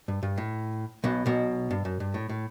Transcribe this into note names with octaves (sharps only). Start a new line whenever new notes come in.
G2
G2
A2
B1 B2
B1 B2
G2
F#2
G2
A2
A2